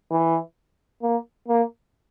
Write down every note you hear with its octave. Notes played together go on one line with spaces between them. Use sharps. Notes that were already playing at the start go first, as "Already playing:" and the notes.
E3
A#3
A#3